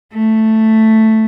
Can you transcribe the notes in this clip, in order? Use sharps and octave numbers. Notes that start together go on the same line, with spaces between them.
A3